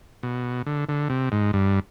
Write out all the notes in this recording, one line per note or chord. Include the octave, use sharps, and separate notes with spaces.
B2
D3
D3
C3
G#2
G2